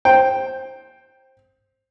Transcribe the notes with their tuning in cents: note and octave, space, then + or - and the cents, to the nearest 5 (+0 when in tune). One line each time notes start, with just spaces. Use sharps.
C5 +15 G5 +0